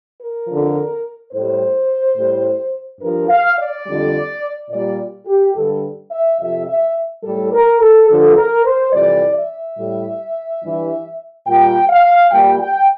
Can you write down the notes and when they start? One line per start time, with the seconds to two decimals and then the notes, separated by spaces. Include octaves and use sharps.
0.19 A#4
0.47 F2 D3 F3
1.32 A2 G3 C5
2.17 A2 G3
3.01 G2 F3 A#4
3.29 F5
3.57 D5
3.86 F2 D3 G3
4.70 A#2 G3 D5
5.26 G4
5.54 G2 D3 G3 A4
6.11 E5
6.39 F2 C3 F3 E5
6.67 E5
7.24 A2 G3 A4
7.52 A#4
7.81 A4
8.08 G2 D3 F3 A4
8.36 A#4
8.64 C5
8.92 F2 C3 E3 G3 D5
9.35 E5
9.77 A2 G3
10.62 G2 E3 G3
11.46 A#2 G3 G5
11.89 F5
12.31 A#2 G3 G5
12.60 G5